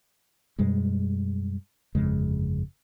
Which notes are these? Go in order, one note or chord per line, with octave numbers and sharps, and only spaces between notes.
F#2 B2 G3 G#3
G1 F2 C#3 G#3